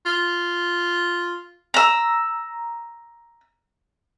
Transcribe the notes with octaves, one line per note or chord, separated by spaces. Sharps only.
F4
A#5 E6